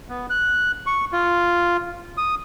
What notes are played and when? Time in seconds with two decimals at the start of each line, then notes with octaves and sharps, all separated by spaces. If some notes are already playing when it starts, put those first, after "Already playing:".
0.09 B3
0.30 F#6
0.87 C#6
1.13 F4
2.18 D#6